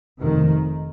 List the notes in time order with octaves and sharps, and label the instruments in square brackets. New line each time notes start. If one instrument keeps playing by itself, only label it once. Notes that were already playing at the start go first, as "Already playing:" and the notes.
[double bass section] F1 F2 C3 D#3